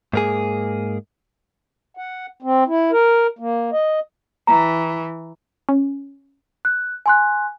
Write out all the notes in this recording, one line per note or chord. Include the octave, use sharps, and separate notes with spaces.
G#2 A#3 G#4
F#5
C4
E4
A#4
A#3
D#5
E3 A#5
C#4
F#6
G#5 C6 F#6